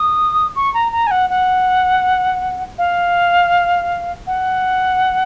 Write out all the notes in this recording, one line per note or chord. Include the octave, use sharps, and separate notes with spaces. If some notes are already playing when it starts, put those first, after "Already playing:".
Already playing: D#6
C#6
A#5
A#5
G#5
F#5
F#5
F5
F#5